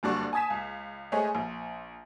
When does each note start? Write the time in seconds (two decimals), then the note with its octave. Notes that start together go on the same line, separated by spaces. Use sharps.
0.03 F#1 G2 D3 F#4 D5 C#6
0.33 G#5 A5 D#6 G#6 B6 E7
0.50 C#2
1.12 G#3 A3 C5 C#5 D#5 G#5
1.35 A#1